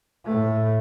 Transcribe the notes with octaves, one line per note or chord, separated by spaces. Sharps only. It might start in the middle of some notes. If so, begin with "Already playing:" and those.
A2 A3